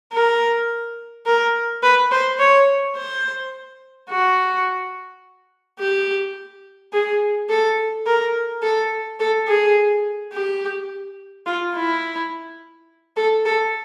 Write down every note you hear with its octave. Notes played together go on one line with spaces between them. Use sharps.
A#4
A#4
B4
C5
C#5
C5
F#4
G4
G#4
A4
A#4
A4
A4
G#4
G4
F4
E4
A4
A4